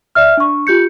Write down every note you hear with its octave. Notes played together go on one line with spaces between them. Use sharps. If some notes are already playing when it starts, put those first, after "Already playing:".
D5 E5 F6
D4 C#6
F4 G4 G6 C#7